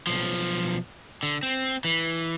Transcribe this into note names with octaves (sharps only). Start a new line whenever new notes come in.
B1 F3
D3
C4
E3